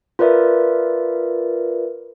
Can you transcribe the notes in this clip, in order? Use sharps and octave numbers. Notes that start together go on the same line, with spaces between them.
F4 A#4 B4 D5 E5